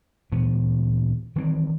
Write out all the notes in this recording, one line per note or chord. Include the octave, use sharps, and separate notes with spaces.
D2 A#2 E3 B3
D#3 E3 G3 C4